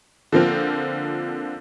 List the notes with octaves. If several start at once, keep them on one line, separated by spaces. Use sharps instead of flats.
D3 F3 A#3 C4 F4